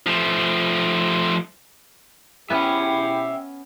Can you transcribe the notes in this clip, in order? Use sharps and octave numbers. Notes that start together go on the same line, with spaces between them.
F3 A3
B3 C#4 E4 G4 E5 G5